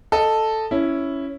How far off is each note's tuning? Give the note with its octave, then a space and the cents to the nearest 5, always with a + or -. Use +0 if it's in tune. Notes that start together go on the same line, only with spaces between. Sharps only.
A4 +0 D#5 -5
C#4 +0 E4 +0